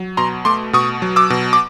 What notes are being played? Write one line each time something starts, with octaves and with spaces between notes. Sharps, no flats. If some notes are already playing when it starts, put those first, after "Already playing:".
Already playing: F#3
B2 A#5 C6
A3 C6 D6
B2 C#6 D#6
F#3
D6 E6
B2
D6